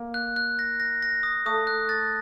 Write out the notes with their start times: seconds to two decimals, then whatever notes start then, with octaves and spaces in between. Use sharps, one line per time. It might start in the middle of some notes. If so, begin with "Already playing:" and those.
Already playing: A#3
0.14 F#6
0.36 F#6
0.59 A#6
0.80 A#6
1.02 A#6
1.23 D#6
1.46 A3 D#6
1.67 F#6
1.89 A6